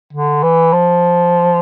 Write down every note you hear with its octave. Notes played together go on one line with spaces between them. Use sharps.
D3
E3
F3